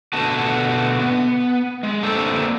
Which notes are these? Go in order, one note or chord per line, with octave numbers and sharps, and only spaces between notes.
B2 D3 A3 F#4 A5
B3
G#3
D3 A#3 C4 A4